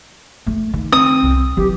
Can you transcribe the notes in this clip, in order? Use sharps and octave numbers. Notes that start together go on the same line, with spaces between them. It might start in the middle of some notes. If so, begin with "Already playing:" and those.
A3
D#3
C4 D#6
C2
E3 F#3 G4